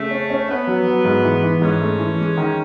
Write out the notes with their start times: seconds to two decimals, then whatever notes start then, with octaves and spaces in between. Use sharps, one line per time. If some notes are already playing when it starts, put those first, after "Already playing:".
Already playing: C#3 A3
0.11 C#4
0.30 C#4
0.49 B3 C#4
0.67 F#3
0.87 F#3
1.05 G#2
1.24 E3
1.43 E3
1.62 G#2 C#4
1.81 A3
1.99 E3
2.19 G#3
2.37 D#3